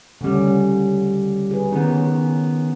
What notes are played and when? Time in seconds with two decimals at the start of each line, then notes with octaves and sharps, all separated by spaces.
0.21 D2 C#3 G3 C#4
1.51 G#4 B4
1.72 D#3 B3 C#4